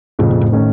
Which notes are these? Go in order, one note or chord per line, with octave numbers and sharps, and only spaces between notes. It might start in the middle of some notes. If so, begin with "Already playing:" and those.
F2 A2 C#3 F3
A#2
A2
D#3 A3 C#4